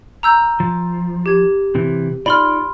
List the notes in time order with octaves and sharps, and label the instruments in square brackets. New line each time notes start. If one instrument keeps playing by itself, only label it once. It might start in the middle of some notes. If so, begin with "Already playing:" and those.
[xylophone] A#5 E6 G6
[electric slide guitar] F3
[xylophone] G4 G#6
[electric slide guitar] C3 E3
[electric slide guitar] D#4 F4 D5 [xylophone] B5 C6 F6